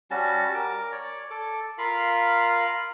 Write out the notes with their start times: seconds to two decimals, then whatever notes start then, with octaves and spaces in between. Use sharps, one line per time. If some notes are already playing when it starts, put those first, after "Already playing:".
0.11 G3 C#4 F#4 A5
0.54 A#4 D6
0.92 C#5 D5
1.30 A4 D6
1.78 F4 A#4 F5 B5